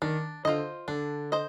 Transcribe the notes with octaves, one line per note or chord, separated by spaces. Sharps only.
D#3 D4
D3 F4 C5 D#5
D3 D4
C5 D#5